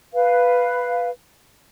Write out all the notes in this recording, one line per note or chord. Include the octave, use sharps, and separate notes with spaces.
B4 F5